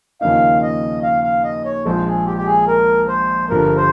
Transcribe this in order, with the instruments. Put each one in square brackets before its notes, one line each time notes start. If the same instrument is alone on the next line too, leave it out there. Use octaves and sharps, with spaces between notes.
[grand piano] D#2 C#3 F3 A#3 D#4 [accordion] F5
[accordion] D#5
F5
F5
D#5
C#5
[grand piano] A#1 A#2 F3 G#3 [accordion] C5
[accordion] G#4
G4
G4
G#4
A#4
C5
[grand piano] G1 G2 F3 [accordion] A#4
[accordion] C5